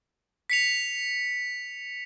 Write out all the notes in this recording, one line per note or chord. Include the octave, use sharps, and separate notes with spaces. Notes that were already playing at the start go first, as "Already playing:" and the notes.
B6 C#7 F7